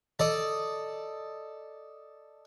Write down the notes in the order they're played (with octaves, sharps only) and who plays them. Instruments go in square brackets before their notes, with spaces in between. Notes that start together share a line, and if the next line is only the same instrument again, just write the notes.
[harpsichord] A4 D5 D#5